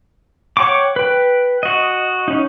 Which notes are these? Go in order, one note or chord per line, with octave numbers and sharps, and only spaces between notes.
C#5 F#5 G5 C#6 D6
B4 G5
F#4 D#5
C#4 D#4